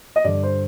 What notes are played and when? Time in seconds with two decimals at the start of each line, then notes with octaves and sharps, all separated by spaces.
0.16 D#5
0.24 G2 D3 D5
0.43 C5